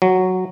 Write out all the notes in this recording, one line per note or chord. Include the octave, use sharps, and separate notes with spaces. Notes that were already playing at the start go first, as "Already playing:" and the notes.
F#3